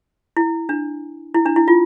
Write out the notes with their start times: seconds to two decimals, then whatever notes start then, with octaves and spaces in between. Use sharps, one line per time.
0.37 E4
0.69 D4
1.34 E4
1.46 D4
1.56 E4
1.68 F4